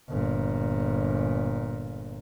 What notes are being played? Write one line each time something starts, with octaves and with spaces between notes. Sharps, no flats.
G1 A#2